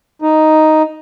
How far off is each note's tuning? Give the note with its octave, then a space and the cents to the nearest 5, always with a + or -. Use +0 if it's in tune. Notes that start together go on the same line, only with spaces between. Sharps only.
D#4 +0